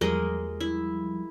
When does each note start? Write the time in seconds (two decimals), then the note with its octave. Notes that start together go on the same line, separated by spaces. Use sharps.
0.01 E2 F3 G3 G#3 A#3 D#5
0.60 E4